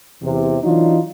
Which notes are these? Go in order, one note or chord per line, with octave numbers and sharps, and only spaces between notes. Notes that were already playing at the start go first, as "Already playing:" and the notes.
E2 C3
E3 F#3 D4 D#4 F4